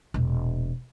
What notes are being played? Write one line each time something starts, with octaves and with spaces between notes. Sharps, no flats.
E1 A#2